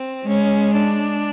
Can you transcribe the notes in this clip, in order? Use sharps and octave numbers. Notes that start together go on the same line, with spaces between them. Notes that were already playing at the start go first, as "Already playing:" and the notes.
Already playing: C4
G#3 C#4
D4